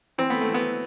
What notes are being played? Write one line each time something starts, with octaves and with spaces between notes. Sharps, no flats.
E3 C4
A3 B3
A3
E3
B3